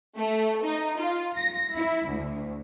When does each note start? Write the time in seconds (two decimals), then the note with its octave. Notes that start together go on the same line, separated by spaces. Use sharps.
0.16 A3
0.63 D#4
0.99 F4
1.37 A#6
1.76 E4
2.07 D2